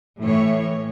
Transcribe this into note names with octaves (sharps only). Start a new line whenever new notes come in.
A2 E3 C#5